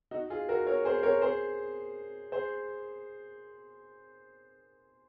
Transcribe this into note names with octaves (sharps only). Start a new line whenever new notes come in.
D#4 F#4
F4 G#4
F#4 A#4
A#4 C#5
G#4 C5
A#4 C#5
G#4 C5
G#4 C5